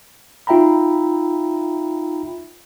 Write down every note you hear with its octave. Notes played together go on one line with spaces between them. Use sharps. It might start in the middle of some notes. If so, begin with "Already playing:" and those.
D#4 F4 E5 G5 A#5 B5